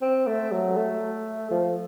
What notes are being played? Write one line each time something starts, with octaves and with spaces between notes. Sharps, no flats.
C4
A3
F#3
A3
F3